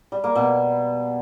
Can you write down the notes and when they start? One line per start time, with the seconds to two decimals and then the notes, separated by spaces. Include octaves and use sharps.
0.12 G3
0.24 A#3
0.36 B2